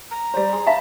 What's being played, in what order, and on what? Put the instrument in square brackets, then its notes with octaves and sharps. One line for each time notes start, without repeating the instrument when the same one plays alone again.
[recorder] A#5
[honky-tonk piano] G3 C5
G#4 C6
[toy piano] E5 F5 [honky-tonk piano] A5 B5